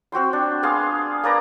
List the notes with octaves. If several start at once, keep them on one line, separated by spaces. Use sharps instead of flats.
C4 F#4 G5 C6
D4
B3 G#4 F5 C6
A#3 B4 D5 A#5